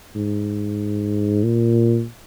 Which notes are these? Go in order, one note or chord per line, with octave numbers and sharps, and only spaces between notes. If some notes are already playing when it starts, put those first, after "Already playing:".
G#2
A#2